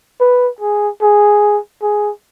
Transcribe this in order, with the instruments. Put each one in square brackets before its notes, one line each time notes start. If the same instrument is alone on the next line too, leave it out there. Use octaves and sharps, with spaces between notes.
[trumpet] B4
G#4
G#4
G#4